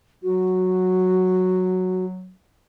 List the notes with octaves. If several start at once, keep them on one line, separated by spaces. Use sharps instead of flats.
F#3 F#4